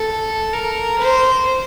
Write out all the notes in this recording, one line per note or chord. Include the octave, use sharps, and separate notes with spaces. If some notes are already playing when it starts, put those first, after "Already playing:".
Already playing: A4
A#4
C5